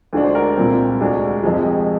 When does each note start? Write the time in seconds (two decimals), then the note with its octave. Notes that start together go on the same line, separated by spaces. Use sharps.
0.13 D2 D3 G#3 D4
0.24 C5
0.35 A#4 D5
0.57 C2 A#2 G#3 C4
1.00 D2 D3 G#3 D4
1.43 F2 C3 F3 G#3 G#4